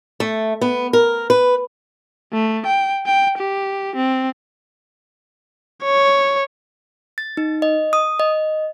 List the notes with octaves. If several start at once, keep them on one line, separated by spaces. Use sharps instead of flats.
A3
B3
A#4
B4
A3
G5
G5
G4
C4
C#5
A6
D#4
D#5
D#6
D#5